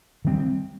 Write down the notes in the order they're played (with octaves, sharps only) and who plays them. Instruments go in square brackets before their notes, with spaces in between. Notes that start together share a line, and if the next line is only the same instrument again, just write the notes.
[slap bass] D#3 G3 C4